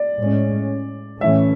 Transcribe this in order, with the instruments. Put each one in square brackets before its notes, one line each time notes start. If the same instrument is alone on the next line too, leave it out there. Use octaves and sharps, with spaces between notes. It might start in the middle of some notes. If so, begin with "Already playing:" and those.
Already playing: [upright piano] D5
[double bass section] A2 G#3 C#4
[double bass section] A2 E3 A3 C#4 [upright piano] E5